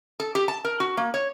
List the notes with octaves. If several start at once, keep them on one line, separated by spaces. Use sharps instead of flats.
A4
G4
A5
A#4
F#4
A#3
C#5